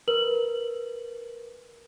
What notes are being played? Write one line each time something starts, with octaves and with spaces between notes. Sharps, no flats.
A#4 B4 F#7